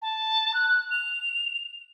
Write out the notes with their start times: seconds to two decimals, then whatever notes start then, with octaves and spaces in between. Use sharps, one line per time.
0.02 A5
0.54 F#6
0.91 F7